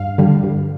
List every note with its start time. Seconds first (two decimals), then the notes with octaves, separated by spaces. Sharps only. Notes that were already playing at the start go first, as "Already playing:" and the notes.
Already playing: G2 F5
0.18 D3 G3
0.44 G2